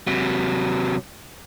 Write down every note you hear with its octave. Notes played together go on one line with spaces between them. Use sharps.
C3 F#3